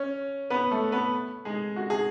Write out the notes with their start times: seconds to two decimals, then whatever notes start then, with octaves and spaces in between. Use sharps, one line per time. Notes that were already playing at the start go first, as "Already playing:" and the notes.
Already playing: C#4 C#5
0.50 B3 B4
0.71 A3 A4
0.92 B3 B4
1.45 G#3 G#4
1.76 F#4
1.90 G#4